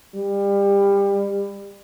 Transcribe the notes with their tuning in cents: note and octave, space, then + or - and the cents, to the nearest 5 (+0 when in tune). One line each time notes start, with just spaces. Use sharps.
G3 +25